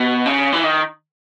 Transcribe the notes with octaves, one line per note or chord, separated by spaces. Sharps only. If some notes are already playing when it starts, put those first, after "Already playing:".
Already playing: B2
C#3
E3
D#3